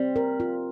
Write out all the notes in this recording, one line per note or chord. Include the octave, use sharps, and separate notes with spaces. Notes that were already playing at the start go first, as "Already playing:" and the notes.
Already playing: G3 C4
A#4
F4